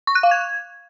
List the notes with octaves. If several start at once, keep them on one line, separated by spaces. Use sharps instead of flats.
C#6
F#6
F5
G#6